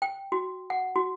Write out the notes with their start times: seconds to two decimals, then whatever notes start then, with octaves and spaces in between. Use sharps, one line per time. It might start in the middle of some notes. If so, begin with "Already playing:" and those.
0.02 G5
0.32 F#4
0.70 F#5
0.96 F#4